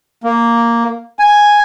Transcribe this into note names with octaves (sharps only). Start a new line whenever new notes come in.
A#3
G#5